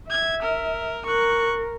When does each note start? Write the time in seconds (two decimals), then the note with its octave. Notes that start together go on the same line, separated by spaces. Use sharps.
0.10 E5 G#6
0.42 A#4
1.06 A#4 C#6 F#6